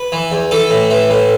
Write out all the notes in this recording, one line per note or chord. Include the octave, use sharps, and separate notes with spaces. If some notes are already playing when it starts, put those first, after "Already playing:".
Already playing: B4
E3
E2
E3 A4
A2
E3
A2